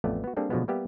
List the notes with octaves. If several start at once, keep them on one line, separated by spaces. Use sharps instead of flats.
A1 F2 A3 B3 D5
B3 F#4
G3 A#3 C4 D4 G#4 A4
B2 D3 F3 F#3 G#3 B3
G3 A#3 B3 G4 E5